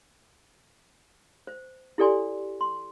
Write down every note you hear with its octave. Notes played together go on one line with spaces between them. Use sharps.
C5
E4 G4 A4 D5 G#5 C6
C6